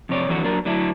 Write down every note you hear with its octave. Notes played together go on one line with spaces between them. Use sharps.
F2 C3 C#5 D5
F2 D3 E3 F#3 D4 F#4
F#3 A#3 D4 A#4
D3 F#3 A3 D4 E4